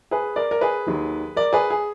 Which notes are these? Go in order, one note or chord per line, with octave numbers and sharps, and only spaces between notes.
G#4 B4
A#4 D5
A#4
G#4 B4
D#2 D#3 F#3
A#4 D5
G#4 B4
G#4